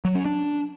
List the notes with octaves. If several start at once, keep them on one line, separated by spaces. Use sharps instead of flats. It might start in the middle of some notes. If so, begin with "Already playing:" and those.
F#3
C#4
D4